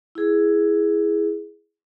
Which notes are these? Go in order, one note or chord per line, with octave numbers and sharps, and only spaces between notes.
E4 G#4